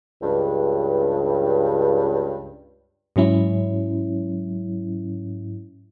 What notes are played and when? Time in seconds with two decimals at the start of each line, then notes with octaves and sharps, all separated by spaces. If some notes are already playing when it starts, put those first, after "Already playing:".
0.22 C#2 G2
3.16 G#2 F#3 C#4 E4